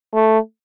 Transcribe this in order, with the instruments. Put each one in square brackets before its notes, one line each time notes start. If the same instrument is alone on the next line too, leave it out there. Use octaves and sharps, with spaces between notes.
[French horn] A3